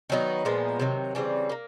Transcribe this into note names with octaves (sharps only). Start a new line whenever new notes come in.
D#3 F#3 B3 D#4
A#2 F3 G#3 B3
C3 D#3 F#3
C#3 E3 G3 C4
A#3 D#4